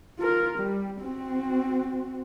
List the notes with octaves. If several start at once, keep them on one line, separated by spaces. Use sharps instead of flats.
F4 A#4
G3
C4 F#4